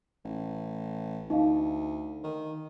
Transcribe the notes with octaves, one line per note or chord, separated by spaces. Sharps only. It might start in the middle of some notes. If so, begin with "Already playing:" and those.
A1
D2 D#4 D#5 F5
D#3